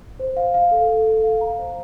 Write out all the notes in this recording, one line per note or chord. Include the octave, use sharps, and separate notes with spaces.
C5
F5
F5
A4
A4
A4
F5
A#5
C5